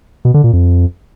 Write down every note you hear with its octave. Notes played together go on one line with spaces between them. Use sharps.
B2
D3
A#2
F2